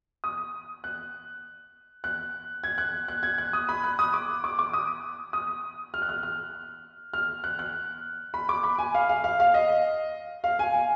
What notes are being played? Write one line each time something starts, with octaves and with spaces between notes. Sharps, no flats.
D#6
F#6
F#6
G#6
F#6
F#6
G#6
F#6
D#6
B5
F#6
D#6
D6
D6
D6
D#6
D#6
F6
F#6
F6
F6
F6
F#6
F#6
B5
D6
B5
G#5
F5
F5
F5
F5
D#5
F5
G#5
G#5